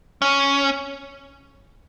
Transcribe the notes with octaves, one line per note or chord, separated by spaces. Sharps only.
C#4